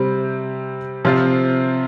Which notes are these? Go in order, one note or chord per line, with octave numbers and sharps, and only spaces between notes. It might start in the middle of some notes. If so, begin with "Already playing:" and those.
Already playing: C3 G3 C4
C3 F3 C4 F4